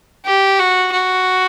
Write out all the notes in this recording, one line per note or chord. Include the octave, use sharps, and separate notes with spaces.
G4
F#4
F#4